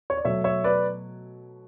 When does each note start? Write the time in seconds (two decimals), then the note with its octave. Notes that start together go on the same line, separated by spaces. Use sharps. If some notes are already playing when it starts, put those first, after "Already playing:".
0.10 C#5
0.17 D5
0.25 B2 F#3 A3 C#5 E5
0.44 C#5 E5
0.64 B4 D5